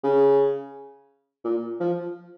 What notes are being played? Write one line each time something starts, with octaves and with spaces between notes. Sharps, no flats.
C#3
A#2
F3